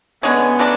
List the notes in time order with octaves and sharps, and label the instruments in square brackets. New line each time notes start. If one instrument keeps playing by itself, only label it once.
[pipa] D3 G#3 C#4 G#4 [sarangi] B3
[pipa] C#3 F#3 A3 D4